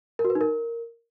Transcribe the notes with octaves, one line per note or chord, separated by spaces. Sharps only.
A#4
F#4
B4
D#4
A#4